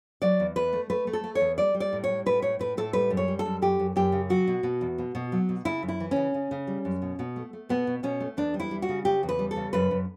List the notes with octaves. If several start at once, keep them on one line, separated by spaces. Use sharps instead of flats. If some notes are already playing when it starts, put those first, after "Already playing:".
F#3 D5
E2
E2 B4
A3
A3 B4
A3
A4
A3
C#5
E2
G3 D5
G3
D5
A2
G3 C#5
A2 B4
A2 C#5
A2 B4
A2 A4
G3 B4
F#2
C#5
G3
A4
F#2
F#2 G4
F#2
F#2 G4
C#3
F#3 F#4
B2
B2
E2
B2
B2
F#3
B2
C#3 E4
F#2
E4
E3
C#3 C#4
C#3
C#3
G3
F#2
B2
B2
A3
A3
B2 B3
B2
B2 C#4
A3
E2 D4
G3
E4
G3
F#4
C#3
C#3 G4
E2
B4
G3
A4
C#3
F#2 B4
F#2